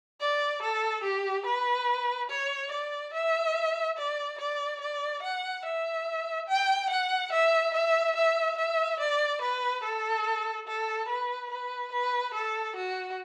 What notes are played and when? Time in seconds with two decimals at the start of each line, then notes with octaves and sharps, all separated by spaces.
0.20 D5
0.62 A4
1.04 G4
1.46 B4
2.29 C#5
2.71 D5
3.13 E5
3.97 D5
4.39 D5
4.81 D5
5.23 F#5
5.65 E5
6.48 G5
6.90 F#5
7.32 E5
7.74 E5
8.16 E5
8.58 E5
9.00 D5
9.41 B4
9.83 A4
10.67 A4
11.08 B4
11.50 B4
11.92 B4
12.34 A4
12.76 F#4